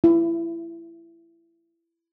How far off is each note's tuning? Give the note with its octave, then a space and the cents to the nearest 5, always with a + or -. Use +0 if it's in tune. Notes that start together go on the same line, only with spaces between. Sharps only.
E4 +20